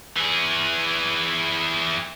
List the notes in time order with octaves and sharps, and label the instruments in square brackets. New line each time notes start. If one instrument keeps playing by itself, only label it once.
[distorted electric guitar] E3 G#4